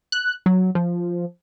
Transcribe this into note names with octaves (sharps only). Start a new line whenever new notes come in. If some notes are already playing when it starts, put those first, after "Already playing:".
F#6
F#3
F3